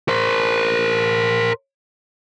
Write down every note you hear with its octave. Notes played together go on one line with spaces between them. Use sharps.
A#4 C5